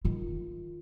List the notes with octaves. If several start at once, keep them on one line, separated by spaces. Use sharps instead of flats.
D#3 F4